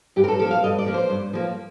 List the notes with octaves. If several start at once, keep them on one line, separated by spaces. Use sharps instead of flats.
G2 G4
A#4
A4
F3 A#3 A4
F5
G2 D#5
D5
F3 A#3
C5
G2
F3 A#3